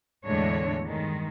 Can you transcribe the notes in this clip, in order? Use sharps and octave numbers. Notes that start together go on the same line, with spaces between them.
E2 A2 D3 G#3 D4 C#5
G2 D#3 G#3